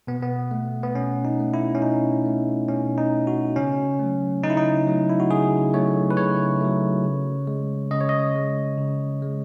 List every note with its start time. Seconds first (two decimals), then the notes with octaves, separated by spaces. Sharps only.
0.07 B2 B3
0.22 B3
0.51 A3
0.83 B3
0.94 B2 C#4
1.25 D#4
1.39 A3
1.54 E4
1.75 C#4
1.82 B2 D#4
2.25 A3
2.68 B2 C#4
2.98 D#4
3.13 A3
3.27 F#4
3.56 C#3 C#4
3.99 F#3 A3
4.43 C#3 D#4
4.50 E4
4.57 D#4
4.87 F#3 A3
5.09 E4
5.20 F#4
5.30 C#3 G#4
5.74 F#3 A3 C#5
6.11 B4
6.17 C#3 C#5
6.61 F#3 A3
7.04 C#3
7.47 G#3
7.91 C#3 D#5
8.01 C#5
8.09 D#5
8.35 G#3
8.78 C#3
9.22 G#3